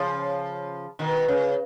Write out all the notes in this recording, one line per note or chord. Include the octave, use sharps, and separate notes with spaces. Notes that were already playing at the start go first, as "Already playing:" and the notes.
Already playing: C#3 F3
B2 D#3
C#3